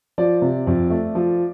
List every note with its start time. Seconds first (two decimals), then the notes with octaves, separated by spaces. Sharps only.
0.18 F3 D5
0.42 C3
0.67 F2
0.90 A3
1.15 F3